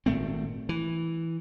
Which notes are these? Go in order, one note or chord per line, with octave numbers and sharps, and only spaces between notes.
G#1 A#2 A3 C4
E3